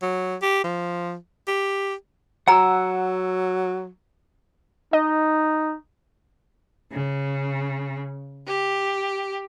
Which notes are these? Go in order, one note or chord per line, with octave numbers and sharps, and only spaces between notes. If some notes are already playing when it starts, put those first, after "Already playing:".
F#3
G4
F3
G4
F#3 F#5 G#5 A#5 E6
D#4 D#5
C#3
G4